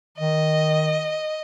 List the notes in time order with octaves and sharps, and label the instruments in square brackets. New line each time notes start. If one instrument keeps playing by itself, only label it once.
[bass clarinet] D#3 [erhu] D#5